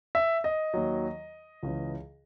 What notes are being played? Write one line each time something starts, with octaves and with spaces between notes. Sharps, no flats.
E5
D#5
D#2 D#3 F#3
C#2 C#3 E3